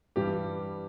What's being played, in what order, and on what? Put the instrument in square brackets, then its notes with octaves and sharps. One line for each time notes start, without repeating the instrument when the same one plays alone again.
[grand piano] G2 E3 G3 G4